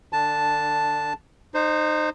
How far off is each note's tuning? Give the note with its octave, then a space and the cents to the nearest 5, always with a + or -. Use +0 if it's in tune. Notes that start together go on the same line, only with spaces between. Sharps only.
D3 +30 D4 +0 A5 +0
D#4 -25 C5 +0